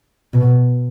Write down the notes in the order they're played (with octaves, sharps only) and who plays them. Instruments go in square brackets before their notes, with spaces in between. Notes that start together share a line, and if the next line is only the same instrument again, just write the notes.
[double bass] B2